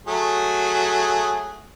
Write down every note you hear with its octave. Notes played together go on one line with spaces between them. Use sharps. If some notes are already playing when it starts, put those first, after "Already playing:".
F#3 A3 G#4